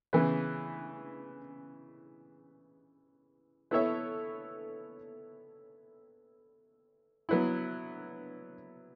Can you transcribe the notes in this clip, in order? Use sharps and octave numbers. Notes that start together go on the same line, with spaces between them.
C#3 E3 B3
B3 E4 A4 C#5 E5
F#3 B3 E4